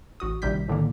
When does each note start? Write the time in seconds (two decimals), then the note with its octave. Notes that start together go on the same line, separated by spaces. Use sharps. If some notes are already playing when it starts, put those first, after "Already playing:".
0.20 A1 F#4 D#6
0.42 A#1 C3 D#3 G3 G6 B6
0.68 A2 D3 D#3 A#3